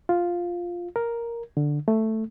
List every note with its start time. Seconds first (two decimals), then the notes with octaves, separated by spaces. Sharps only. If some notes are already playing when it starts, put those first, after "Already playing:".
0.09 F4
0.96 A#4
1.57 D3
1.88 A3